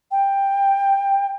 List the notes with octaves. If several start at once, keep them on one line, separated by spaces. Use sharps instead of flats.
G5